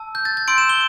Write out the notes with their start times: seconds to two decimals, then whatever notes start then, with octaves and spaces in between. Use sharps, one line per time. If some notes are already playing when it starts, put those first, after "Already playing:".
Already playing: A5 E6
0.15 G6
0.25 A6
0.37 A6
0.48 C6 E6 G6 D7
0.58 E7
0.69 G7